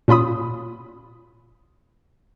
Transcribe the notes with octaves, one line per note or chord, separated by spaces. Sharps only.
A#2 C#4 F4 B5 D#6